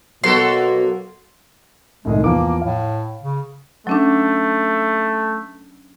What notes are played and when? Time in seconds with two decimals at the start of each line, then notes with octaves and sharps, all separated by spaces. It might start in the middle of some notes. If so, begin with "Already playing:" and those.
0.24 B2 F#3 A#3 F#4 A4 C6
2.05 C2 A2 D#3 G#3
2.24 E2 F3 A#3 D6
2.62 A2 F5
3.23 C#3
3.87 F#3 A3 C#4 D4